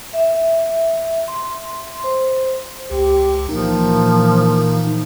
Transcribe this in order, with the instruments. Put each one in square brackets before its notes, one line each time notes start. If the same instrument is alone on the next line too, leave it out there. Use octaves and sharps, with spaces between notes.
[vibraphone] E5
C6
C5
[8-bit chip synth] C#2 [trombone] G4
[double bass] A#2 E3 [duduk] F3 [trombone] A#3 [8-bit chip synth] D#4